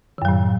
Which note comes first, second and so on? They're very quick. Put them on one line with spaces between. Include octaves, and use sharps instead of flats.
D#3 F#2 F#3 A2